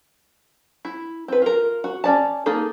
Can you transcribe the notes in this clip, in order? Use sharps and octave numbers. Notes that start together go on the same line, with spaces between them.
E4
C4 B4
F4 A#4
F#4
C#4 D5 A5
A#3 D#4 G#4 A4